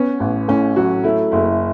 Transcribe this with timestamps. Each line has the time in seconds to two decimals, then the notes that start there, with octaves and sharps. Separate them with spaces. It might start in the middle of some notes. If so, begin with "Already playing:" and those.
Already playing: B3 C#4
0.20 A1
0.48 A2 C#4
0.76 F#3 F#4
1.04 A3 E4
1.32 F#1 E4